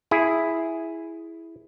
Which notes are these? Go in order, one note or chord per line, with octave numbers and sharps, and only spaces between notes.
E4 G#4